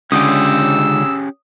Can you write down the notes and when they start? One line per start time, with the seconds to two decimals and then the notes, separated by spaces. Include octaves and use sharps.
0.12 C#2 D3 C#4 G4 G#4 D#6 E6